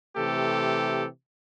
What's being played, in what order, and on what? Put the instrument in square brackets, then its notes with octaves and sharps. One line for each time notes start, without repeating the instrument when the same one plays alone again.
[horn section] C3 E3 A3 G4 A4